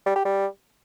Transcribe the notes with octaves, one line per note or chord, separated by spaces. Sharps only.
G3
G4
G3